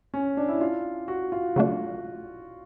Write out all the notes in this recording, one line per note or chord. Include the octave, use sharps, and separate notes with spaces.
C#4
D4
E4
F4
F#4
F4
C#3 F#3 A3 D4